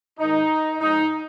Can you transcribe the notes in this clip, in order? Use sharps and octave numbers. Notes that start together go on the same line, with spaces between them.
G#2 D#3 D#4
G#2 F3 D#4